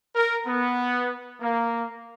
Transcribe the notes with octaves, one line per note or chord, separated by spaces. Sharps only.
A#4
B3
A#3